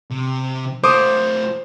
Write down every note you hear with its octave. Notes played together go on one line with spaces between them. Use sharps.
C3
A3 F4 C5 D6 D#6